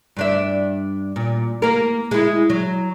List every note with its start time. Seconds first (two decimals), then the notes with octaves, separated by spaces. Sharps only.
0.16 G2 D4 E5
1.16 A#2
1.62 A#3 A#4
2.11 G#3 E4
2.50 F#3